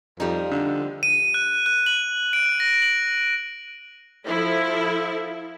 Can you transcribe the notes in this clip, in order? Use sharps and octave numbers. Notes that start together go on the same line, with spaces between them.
F2 F3 G3 D#4
D3
D#7
F#6
F#6
F#7
D7
A#6
F#7
F3 E4 A4